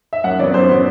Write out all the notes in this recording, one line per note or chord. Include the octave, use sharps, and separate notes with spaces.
E5
F#2 F#5
F#3 B3 D5
F#2 C5
F#3 B3